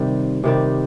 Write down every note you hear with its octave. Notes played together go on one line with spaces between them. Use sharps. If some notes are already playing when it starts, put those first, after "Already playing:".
Already playing: C3 D#3 G3
C3 D#3 G3